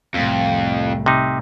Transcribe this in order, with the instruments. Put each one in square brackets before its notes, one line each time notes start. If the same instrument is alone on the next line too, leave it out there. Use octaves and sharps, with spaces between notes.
[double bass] C2 A2 [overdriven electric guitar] F2
[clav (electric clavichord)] C3 D#4